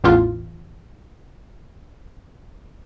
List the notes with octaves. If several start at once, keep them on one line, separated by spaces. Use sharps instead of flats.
A1 E2 F4